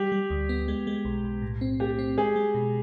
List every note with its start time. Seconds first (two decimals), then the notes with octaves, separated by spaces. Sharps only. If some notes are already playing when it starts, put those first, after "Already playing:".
Already playing: G3 G4
0.12 G3
0.30 D2
0.49 B3
0.68 G#3
0.87 G#3
1.05 B1
1.24 B1
1.42 A2
1.61 C4
1.80 A3 G4
1.99 C4
2.18 G#3 G#4
2.36 G#3
2.55 B2